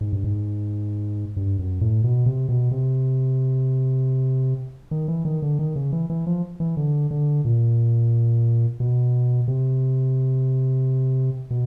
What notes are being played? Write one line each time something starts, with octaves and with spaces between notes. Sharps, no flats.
G#2
G2
G#2
G2
F#2
A2
B2
C3
B2
C3
D#3
E3
D#3
D3
D#3
C#3
E3
E3
F3
E3
D3
D3
A#2
B2
C3
B2